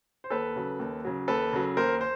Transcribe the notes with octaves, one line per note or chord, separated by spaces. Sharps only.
C5
D#2 A4 B4
C#3 F#3
D#2
C#3 F#3
D#2 A4 B4
C#3 F#3
D#2 A#4 C5
C5